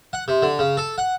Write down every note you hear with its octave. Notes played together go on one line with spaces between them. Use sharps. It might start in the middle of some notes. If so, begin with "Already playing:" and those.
F#5
C3
D3
C#3
A4
F#5